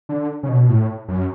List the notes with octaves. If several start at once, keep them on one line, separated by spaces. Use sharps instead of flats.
D3
C#3
B2
A2
F#2